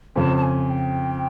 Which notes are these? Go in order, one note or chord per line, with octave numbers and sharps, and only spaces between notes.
F2 C#3 F3 A5
A5
G#5
G5